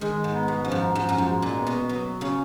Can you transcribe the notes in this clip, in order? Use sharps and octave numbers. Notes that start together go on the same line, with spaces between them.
D#3 G#3
G#2
B3
B2
F#2 F3
G#2
G#2 F3
F#2
G#2
G#3
A#2
B3
B2
B2 F#3
C#3 C#4